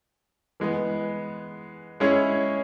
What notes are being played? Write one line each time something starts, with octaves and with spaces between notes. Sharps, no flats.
E3 G#3 B3
G#3 C#4 E4 G#4 C#5